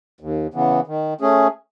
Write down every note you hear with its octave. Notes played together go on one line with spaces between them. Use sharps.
D#2
C#3 E3 B3
D#3
A3 C#4 G#4